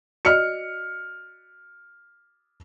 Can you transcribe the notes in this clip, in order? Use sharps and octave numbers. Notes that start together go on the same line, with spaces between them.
F#4 D5 D#5 F6 C#7